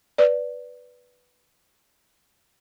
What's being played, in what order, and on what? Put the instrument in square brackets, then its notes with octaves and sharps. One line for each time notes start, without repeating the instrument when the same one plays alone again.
[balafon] B4 D5